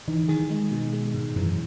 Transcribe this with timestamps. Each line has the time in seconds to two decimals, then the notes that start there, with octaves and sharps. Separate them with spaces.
0.08 E3 D#4
0.28 D#3 G#4
0.50 G#3
0.71 B2
0.93 G#3
1.14 G#2
1.36 F#2 E3